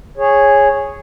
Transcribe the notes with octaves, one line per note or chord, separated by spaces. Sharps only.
G#4 C#5